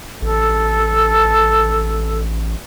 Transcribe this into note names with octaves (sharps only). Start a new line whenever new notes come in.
A1 A4